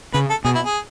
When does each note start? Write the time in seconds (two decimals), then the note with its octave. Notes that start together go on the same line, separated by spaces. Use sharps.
0.14 C#3 B4
0.30 A4
0.45 B2 G#4
0.55 E4
0.66 G#4